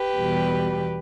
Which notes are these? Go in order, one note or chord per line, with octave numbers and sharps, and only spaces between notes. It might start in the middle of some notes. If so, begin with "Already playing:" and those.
Already playing: G4 B4
E2 B2 G3